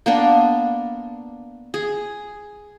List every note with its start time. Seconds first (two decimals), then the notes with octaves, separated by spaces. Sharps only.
0.06 A#3 B3 D4
1.74 G#4